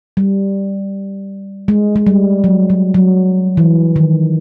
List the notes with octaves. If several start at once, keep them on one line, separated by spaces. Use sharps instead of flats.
G3
G#3
G#3
G3
F#3
F#3
F#3
E3
D#3